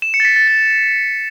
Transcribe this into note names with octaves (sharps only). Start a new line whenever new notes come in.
E7
C#7
A6
B6
A6
A6